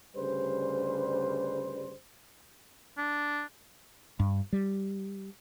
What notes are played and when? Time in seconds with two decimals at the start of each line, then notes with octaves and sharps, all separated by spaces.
0.16 D2 G2 C#3 G3 B4 C5
2.98 D4
4.20 G2
4.53 G3